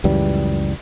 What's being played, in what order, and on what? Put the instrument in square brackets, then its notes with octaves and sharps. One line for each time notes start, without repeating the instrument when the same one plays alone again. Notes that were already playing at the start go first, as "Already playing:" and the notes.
[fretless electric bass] C#2 F#2 E3 G3